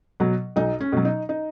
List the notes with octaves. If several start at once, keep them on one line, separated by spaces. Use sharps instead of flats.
B2 F#3
B1 D#4
C#4
B2 F#3
D#4
D#4